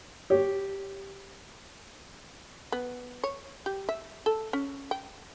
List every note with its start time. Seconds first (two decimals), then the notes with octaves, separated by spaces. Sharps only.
0.30 G4 C#5
2.72 B3
3.24 C#5
3.66 G4
3.89 E5
4.26 A4
4.53 C#4
4.91 G5